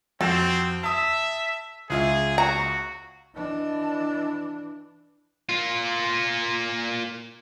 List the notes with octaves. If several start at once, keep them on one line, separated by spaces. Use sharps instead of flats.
F2 C4 F#4 A4 E7
E5 A5 D#6
C#2 F4 G#4 E5
F#4 A#5
E3 D4 D5 D#5 A5
A#3 F4